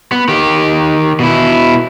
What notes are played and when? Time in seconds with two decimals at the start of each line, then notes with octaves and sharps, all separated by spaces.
0.12 B3
0.28 D#3 G4
1.20 B2 E4